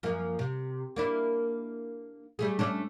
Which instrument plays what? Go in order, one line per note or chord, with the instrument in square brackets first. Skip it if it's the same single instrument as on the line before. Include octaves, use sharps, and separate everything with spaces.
[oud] F#2 F3 A#3
C3
A#3 D4 E4
G3 A3 G#4
A3 C#4 D4